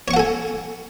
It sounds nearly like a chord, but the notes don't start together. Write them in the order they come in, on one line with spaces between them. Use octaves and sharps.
C#5 C#6 F#5 A4 G#5